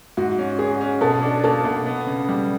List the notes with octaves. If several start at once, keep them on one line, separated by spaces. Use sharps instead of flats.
G#2 F#4
C#4
C#4 G#4
C#4
B2 A4
D4
A#3 A4
B2
B3
C#3
G3